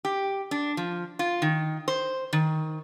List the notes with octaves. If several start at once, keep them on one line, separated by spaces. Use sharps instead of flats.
G4
D4
F3
F4
D#3
C5
D#3